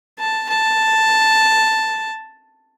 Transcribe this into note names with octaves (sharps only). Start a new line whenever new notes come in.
A5
A5